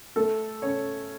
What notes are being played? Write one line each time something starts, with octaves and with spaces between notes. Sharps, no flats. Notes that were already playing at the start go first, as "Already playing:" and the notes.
A3 A4
C#4 C#5